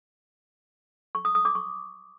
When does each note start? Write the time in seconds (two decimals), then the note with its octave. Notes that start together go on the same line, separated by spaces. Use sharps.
1.15 C#6
1.25 D#6
1.35 D#6
1.45 D6
1.55 C#6